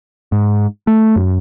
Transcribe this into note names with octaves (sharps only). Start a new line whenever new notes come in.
G#2
A3
F#2